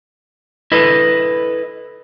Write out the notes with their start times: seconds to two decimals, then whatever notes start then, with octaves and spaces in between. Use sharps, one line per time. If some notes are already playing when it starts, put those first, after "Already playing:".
0.72 E4 A4 B4 D#5